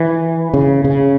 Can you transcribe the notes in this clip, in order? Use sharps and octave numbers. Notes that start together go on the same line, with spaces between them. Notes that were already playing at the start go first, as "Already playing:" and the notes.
Already playing: E3
C#3
C#3